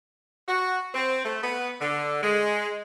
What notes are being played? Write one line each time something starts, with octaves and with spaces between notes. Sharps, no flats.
F#4
C4
A3
B3
D3
G#3